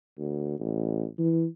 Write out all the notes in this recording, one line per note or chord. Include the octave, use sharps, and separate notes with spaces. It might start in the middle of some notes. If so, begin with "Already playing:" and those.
D2
A1
E3